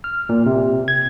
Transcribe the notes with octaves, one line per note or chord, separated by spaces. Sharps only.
F6
A#2
C3
G#6